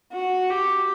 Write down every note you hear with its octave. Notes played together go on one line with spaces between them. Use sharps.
F#4
G4